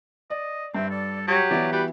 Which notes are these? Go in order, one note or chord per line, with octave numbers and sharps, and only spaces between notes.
D5 D#5
G2 C4 E5
A4 D5
F#3 G4 C#5
E3 B3 F#4 D5
G3 B4